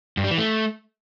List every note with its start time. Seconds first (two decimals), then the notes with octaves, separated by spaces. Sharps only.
0.17 G2
0.24 G3
0.31 E3
0.38 A3